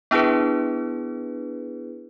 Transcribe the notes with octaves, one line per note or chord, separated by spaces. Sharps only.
B3 D4 E4 G#4 B4